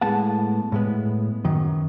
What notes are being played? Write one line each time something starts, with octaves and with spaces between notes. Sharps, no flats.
A2 G#3 B3 F#5 A5
A2 G#3 B3
F#2 D#3